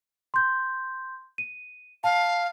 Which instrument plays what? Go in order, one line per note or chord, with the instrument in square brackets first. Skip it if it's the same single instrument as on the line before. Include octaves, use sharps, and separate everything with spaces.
[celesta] C6 G6
D#7
[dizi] F5 [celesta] A5